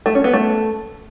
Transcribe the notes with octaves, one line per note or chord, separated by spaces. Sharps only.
A3
C#4
B3
A3